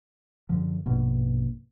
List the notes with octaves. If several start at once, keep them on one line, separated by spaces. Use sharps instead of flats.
F#2 D3 F3
A#1 G2 B2 A#3